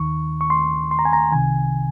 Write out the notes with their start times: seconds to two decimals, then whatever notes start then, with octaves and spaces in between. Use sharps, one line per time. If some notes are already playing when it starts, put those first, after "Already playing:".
Already playing: D#2 D#3 C#6
0.41 C#6
0.50 C6
0.91 C6
0.99 A#5
1.05 G#5
1.13 A#5
1.32 C2 C3 D#3 G#5